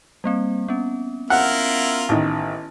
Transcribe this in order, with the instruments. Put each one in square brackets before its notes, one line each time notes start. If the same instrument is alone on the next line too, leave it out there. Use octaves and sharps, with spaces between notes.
[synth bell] G3 A#3 C4
B3 C#4
[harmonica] E4 F4 A#4 [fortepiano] F#5
[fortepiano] A1 D#3